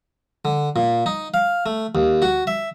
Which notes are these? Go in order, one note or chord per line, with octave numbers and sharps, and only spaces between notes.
D3
A#2
D#4
F5
A3
D#2
F#4
E5